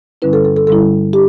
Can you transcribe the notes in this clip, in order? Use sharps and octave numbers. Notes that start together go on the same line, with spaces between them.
G2 D3 G3 C#4 E4 B4
A4
A4
A4
G2 D3 G3 C#4 E4 A4
D4 G4